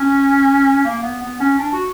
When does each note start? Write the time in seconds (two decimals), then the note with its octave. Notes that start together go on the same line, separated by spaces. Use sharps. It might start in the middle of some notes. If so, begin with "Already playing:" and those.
Already playing: C#4
0.85 A#3
1.03 B3
1.22 B3
1.40 C#4
1.59 D4
1.73 F#4